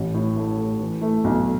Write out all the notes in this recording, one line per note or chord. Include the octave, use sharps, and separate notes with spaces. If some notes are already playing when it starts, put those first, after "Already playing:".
Already playing: A1
A2
A3
A3
E3
A3
B1